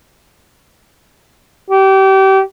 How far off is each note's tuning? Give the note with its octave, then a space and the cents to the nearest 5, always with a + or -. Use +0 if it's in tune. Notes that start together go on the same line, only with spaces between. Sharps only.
G4 -30